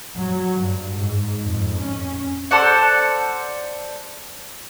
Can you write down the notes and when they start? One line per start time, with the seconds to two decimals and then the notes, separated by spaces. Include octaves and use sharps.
0.17 F#3
0.60 G2
0.97 G#2
1.44 F2 G#2
1.78 C#4
2.51 A4 C5 D5 F#5